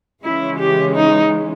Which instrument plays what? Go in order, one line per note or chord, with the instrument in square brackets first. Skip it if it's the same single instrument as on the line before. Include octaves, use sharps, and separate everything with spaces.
[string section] C#3 E3 G#3 C#4 [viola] E4
[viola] G4
D#4